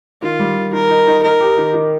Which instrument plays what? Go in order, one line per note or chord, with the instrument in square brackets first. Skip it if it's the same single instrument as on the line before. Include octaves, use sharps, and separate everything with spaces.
[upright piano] D#3 [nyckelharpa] F4
[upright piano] G3
D#3
[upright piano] D#3 [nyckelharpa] A#4
[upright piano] D#4
D#4
[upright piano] D#4 [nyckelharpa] A#4
[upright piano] G4
D#3
D#3